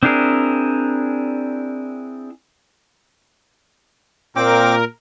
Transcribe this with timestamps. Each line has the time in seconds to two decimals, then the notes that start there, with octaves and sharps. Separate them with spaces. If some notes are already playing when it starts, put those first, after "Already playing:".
0.03 C4 D4 E4 G#4 A#4
4.36 A#2 C4 A#4 G5 D6